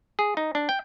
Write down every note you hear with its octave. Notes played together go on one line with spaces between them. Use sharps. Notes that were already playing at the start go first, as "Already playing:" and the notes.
G#4
D#4
D4
G5